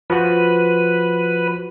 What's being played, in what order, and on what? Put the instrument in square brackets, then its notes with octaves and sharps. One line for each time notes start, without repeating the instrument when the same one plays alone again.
[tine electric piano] F3 F#4 [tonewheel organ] B4